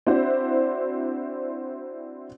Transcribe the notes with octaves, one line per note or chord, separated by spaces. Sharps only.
C4 D4 E4 F#4 C5